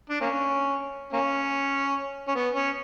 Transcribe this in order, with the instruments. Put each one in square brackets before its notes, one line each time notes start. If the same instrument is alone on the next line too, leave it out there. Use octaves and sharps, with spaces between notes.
[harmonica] D4
A#3 C#4
A#3 C#4
C#4
B3
C#4